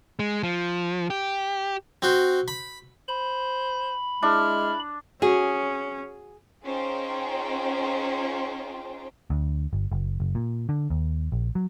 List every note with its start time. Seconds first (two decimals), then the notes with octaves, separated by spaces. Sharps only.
0.19 G#3
0.43 F3
1.10 G4
2.02 C4 F#4 C5
2.48 B5
3.08 C5 B5
4.23 G#3 D4 E4 F6
5.22 C#4 F#4 G#4
6.65 C#4 D#4 F4 G#4 C5 G5
9.30 D2
9.73 G1
9.92 F#1
10.20 F#1
10.35 A#2
10.69 D3
10.90 D#2
11.32 A#1
11.55 F#3